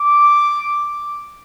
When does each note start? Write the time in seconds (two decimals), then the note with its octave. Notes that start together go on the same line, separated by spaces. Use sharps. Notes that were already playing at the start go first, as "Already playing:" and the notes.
Already playing: D6